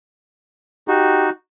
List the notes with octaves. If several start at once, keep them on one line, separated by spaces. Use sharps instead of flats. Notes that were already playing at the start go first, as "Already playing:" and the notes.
D#4 F#4 G4